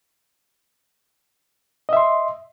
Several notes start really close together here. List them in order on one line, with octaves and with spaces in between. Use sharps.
D#5 E5 C6